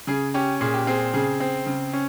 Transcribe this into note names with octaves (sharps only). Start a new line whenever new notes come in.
C#3 G#4
C#4 G4
A#2 G#4
G4
C4 G#4
C#3 G#4
C4
C#3
C#4